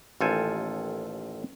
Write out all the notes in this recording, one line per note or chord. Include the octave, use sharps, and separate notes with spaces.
A1 D#2 F4 A4 G5 G#5